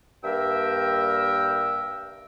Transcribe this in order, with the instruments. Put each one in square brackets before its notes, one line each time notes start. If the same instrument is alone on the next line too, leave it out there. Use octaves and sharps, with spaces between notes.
[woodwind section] G2 A#3 A#4 E5 G5 E6